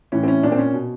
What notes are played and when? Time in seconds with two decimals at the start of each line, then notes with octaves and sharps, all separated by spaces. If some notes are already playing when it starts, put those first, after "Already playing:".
0.12 A2 E3 C#4
0.23 C4
0.28 C#4
0.43 A#2 D4
0.52 C4
0.58 C#4
0.74 B2